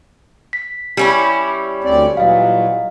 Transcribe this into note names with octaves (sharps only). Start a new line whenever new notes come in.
B6
G3 C#4 E4 G4
D2 C4 D5
A#2 E3 F#3 D#5 F5